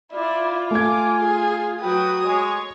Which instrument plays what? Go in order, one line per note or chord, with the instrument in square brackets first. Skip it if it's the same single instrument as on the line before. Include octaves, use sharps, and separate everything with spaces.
[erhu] E4 [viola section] F4 [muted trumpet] D5
[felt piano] A3 G#6 [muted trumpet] G#5 [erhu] D6
[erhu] G#4
[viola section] F#3 F#4 B4 [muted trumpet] G5 [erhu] D#6
[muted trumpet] G#3 [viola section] C#5